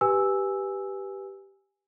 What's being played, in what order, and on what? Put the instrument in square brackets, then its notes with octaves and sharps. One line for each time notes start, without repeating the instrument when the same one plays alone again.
[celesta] G4 B4 G#5 E6